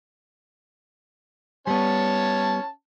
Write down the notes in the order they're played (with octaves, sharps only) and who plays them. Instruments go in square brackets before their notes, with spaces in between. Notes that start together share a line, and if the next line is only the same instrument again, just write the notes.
[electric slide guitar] G3 B3 [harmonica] C#4 C#5 A5